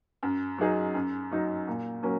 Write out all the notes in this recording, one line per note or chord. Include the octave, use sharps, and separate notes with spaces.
F#2
F#3 D#4 G#4
F#2
F#3 D#4
A#2
F#3 A#3 C#4 A#4